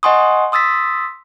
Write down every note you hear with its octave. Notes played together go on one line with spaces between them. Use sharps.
D#5 F#5 G#5 C6 C#6 D#6
C6 D#6 E6 A6 B6